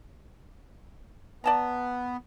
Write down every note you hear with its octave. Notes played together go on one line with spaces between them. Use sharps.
B3 D5 A5 A#5